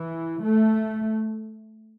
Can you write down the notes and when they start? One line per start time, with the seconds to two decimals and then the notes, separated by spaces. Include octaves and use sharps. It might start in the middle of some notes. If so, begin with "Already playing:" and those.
Already playing: E3
0.42 A3